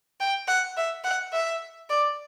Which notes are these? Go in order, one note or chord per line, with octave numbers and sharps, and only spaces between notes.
G5
F#5
E5
F#5
E5
D5